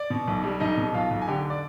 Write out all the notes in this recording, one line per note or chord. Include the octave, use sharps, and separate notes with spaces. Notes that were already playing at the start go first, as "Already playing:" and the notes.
Already playing: D5
B2
B1
G3
B1 D#4 D#5
B2
B1 F4 F5
B1
G#5
D3 G4 G5
D5 D6